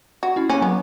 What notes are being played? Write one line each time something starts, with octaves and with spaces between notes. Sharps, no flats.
F#4
C#4 E4
A#3 C#4
F#3 B3